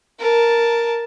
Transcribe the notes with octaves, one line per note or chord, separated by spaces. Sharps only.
A#4 A5